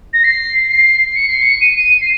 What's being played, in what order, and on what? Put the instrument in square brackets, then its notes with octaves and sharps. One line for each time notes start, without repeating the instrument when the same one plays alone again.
[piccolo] A#6
C7
C7
C#7
C7
C#7
D#7
D#7
C7